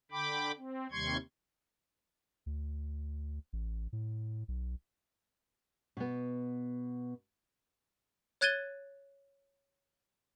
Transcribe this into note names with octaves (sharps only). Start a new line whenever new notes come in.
D3 G5 B5 D6
C4
D#2 C3 G3 C6 C#6 G#6
D2
A1
A2
B1
B2 B3
C#5 F#6 G#6 A6 D#7 G7